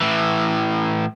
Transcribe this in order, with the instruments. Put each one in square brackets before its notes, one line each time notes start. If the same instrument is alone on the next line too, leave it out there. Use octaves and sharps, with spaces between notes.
[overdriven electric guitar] A2 E3